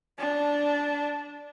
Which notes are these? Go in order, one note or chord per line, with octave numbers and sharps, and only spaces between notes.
D4